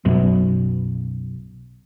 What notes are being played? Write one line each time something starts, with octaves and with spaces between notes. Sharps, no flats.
B1 F#2 B2